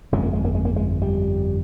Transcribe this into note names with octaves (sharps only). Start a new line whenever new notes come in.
G1 F2 C#3 G#3
A#3
G#3
A#3
G#3
A#3
G#3
G3